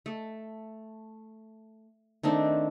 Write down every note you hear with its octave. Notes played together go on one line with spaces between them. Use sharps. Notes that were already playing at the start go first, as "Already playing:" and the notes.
A3
D#3 A3 C4 D4